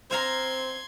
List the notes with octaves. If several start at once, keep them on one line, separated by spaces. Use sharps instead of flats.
C4 C5 F5 A#5 C6 G#6